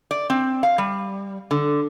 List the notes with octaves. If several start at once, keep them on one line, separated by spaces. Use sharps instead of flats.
D5
C4
F5
G3
D3